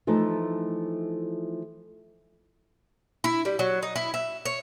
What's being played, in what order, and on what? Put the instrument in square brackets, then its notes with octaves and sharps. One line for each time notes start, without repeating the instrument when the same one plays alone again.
[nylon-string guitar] E3 F3 A3 D#4
[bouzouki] E4
G3
F#3
D#4
E4
E5
C#5